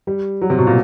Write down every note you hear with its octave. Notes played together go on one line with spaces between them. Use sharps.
G3
F#3
C3
B2
A#2